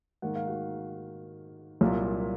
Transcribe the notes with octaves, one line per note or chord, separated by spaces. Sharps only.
G#2 D#3 A#3 F#5
F5
F#4 F#5
C2 A#2 F#3 A#3